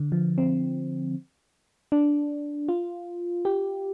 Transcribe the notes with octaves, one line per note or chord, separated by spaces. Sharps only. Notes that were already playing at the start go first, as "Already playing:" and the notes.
Already playing: D3
F3
C4
D4
F4
G4